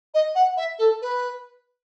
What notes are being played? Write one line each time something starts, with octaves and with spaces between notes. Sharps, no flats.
D#5
F#5
E5
A4
B4